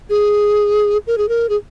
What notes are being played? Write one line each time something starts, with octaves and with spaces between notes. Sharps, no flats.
G#4
A#4
G#4
A#4
G#4